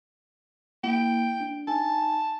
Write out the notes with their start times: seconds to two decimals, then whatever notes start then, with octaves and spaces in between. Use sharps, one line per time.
0.83 A#3 E4 G5
1.40 D4
1.68 D#4 G#5 A5